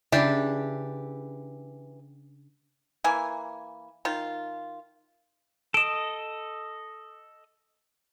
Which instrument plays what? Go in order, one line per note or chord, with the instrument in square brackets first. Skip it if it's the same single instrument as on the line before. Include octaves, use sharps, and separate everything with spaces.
[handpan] C#3 [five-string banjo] E3 G4 [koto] D4
[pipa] E3 A#3 G#5
D#3 F4
[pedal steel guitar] A4 D#5 [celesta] D7 E7